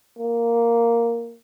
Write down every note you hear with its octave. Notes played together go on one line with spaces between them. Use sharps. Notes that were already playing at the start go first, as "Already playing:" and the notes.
A#3